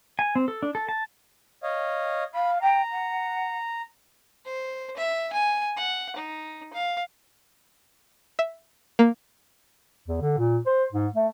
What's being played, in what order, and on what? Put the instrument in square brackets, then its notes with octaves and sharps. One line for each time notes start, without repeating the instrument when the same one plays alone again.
[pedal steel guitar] G#5
C4
A4
D4
A4
A5
[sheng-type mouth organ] C#5 D#5 F5
[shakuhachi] F5 [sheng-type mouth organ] B5
[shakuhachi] G5 [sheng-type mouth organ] A#5
[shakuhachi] F#5
[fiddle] C5
E5
G#5
F#5
D#4
F5
[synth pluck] E5
A#3
[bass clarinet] E2
D3
A#2
C5
G#2
A3